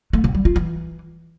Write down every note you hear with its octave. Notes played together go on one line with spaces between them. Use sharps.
A3
C#3
G3
F4
E3